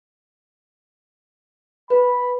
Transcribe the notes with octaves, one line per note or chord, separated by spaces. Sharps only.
B4 B5